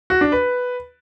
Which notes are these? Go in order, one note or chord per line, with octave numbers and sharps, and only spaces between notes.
F#4
D4
B4